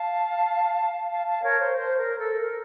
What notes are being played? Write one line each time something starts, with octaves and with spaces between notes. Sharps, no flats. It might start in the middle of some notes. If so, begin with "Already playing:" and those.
Already playing: F5 A5
F5 A5
F5 A5
A#4 C#5
C5
C5
A#4
A4
A#4